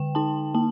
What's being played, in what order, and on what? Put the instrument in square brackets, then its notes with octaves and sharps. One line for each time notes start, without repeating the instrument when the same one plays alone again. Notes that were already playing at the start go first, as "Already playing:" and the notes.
Already playing: [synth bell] D3 G5
D#4 A5
A#3 A5